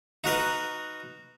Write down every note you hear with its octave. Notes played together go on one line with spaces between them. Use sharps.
D#4 F#4 A#4 B4